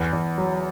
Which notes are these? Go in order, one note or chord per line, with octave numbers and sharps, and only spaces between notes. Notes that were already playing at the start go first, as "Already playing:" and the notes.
Already playing: E2
E2
F#3